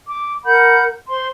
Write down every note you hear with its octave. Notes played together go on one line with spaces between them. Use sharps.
D6
A#4 F#5 B5 G6
C5 C6